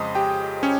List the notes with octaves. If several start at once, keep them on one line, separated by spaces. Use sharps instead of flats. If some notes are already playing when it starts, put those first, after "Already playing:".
Already playing: F2 C#3 G#3 C5 D#5 C6 D#6
G4 G5
C#4 C#5